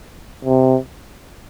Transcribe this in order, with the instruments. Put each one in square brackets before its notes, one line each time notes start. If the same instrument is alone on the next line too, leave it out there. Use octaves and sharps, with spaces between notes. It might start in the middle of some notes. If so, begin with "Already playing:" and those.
[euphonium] C3